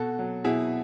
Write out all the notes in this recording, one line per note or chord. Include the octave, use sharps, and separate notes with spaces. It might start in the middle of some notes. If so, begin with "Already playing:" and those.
Already playing: B2 F#4 A4
F#3
B2 E4 G#4